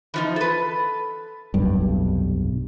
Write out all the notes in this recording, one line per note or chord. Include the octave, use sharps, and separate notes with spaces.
E3 F3 D#4
A4 B4
F1 B1 G2